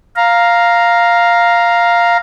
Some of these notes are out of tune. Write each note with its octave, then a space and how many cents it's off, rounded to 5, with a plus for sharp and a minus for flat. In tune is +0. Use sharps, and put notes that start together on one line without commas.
F5 +0 A#5 +0